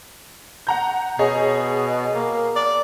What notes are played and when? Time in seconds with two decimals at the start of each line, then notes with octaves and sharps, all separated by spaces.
0.67 F#5 A#5 G6
1.19 B2 G#4 C#5 D#5
2.14 A#3
2.56 D5